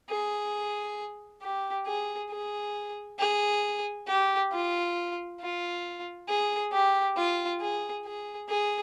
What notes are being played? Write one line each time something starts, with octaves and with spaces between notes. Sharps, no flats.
G#4
G4
G#4
G#4
G#4
G4
F4
F4
G#4
G4
F4
G#4
G#4
G#4